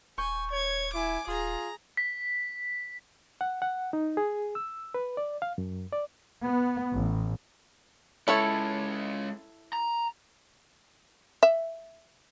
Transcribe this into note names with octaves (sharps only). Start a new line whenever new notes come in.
D#1 G#5 C#6 G6
C#5 G#6
E4 G#5 D6
D#1 F4 G#4 A#5
B6
F#5
F#5
D#4
G#4
E6
B4
D5
F5
F#2
D5
B3
A1
G#3 C#4 E4 A4 C#5
A#5
E5